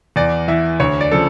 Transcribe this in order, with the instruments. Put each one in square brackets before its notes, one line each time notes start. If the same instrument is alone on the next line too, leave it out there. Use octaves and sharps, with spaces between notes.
[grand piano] E2 D5
E3 E5
D2 C#5
D5
C#3 F3 A4